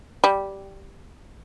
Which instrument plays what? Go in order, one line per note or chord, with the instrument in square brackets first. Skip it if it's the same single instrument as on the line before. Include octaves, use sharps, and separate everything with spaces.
[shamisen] G3